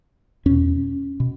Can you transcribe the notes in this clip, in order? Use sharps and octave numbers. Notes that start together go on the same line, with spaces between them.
E2 B2 C#4
B2